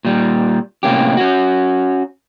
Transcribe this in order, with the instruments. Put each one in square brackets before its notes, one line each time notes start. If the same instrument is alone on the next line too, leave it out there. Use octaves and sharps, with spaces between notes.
[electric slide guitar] A#2 G3
A2 C3 A#3 C#4 G4
C#4 F#4